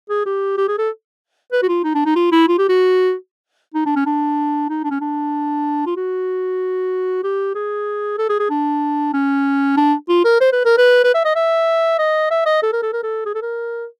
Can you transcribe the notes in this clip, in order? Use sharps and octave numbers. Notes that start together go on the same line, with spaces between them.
G#4
G4
G4
G#4
A4
B4
F#4
F4
D#4
D4
D#4
F4
E4
F4
G4
F#4
D#4
D4
C#4
D4
D#4
D4
C#4
D4
F4
F#4
G4
G#4
A4
G#4
G#4
D4
C#4
D4
F4
A#4
C5
B4
A#4
B4
B4
E5
D#5
E5
D#5
E5
D#5
A4
A#4
A4
A#4
A4
G#4
A4
A#4